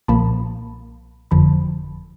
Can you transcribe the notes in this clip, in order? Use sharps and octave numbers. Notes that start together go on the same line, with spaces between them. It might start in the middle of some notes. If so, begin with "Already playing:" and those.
B1 A#2 F3 A#3 A5 B5
G1 F2 D3 F3 A5 B5